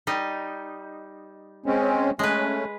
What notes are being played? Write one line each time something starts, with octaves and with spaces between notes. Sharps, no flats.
G3 D#4
G#3 C4 C#4
G#3 A3 C#4 B4